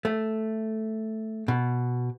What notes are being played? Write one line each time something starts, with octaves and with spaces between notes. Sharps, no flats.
A3
B2